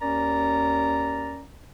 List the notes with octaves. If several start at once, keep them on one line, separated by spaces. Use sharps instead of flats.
D#2 C#4 A#4 D5 A#5